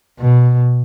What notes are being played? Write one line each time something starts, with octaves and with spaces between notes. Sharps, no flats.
B2